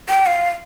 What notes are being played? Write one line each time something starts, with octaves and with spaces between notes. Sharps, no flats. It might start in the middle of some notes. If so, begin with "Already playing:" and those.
G5
F5